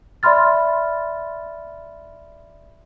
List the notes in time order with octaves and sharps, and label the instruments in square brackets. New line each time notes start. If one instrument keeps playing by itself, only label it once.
[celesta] D5 E5 B5 C6 F6 A6